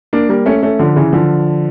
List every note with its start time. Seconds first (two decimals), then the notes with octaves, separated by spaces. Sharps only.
0.13 A#3 D4
0.29 G3 A#3
0.46 A3 C#4
0.63 A3 C#4
0.79 D3 F3
0.96 C#3 E3
1.13 D3 F3